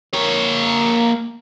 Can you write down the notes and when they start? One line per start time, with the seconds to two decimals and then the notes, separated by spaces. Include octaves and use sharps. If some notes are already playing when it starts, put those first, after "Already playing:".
0.13 A#3 C#5